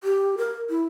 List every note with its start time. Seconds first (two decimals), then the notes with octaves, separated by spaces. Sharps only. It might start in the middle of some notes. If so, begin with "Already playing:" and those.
0.04 G4
0.38 A#4
0.69 E4